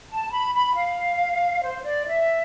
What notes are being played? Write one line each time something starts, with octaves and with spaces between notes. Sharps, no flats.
A5
B5
B5
F5
C5
D5
E5